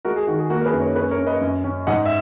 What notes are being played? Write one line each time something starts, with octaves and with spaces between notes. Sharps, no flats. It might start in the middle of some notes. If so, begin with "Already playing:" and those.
G#3 F#4 A#4
G#4
D#3 F#4
G#4
A#3 F#4 A#4
A#4
G#4 B4
F#2
A#4 C#5
C#4 G#4 B4
A#4 C#5
C#4
B4 D#5
F#2
C#4
G#2 D#5 F#5
E5